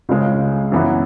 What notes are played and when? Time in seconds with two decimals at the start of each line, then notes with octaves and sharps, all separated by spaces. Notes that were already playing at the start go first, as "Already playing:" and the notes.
0.09 C#2 C#3 G#3
0.72 F#2 E3 B3 E4